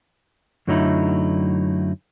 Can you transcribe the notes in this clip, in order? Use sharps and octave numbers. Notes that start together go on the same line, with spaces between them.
F#2 D3 F#3 A3 D#4 E4